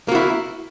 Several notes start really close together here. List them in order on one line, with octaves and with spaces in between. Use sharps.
A#3 F#4 E4